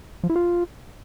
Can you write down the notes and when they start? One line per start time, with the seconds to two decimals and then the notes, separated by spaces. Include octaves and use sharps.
0.24 F3
0.30 E4
0.36 F4